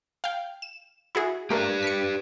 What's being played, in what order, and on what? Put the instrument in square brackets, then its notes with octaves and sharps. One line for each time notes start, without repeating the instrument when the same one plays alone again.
[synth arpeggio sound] F5 G5
E7
E4 F#4 G#4
[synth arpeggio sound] A3 A#3 [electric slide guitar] G4 B4 D5
[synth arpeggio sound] B6 C#7